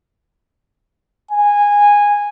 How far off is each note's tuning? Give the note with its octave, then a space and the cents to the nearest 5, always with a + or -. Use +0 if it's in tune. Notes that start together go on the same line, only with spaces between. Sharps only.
G#5 -15